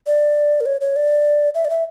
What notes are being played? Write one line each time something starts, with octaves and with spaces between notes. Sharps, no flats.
D5
A#4
C#5
C#5
D5
E5
D5
E5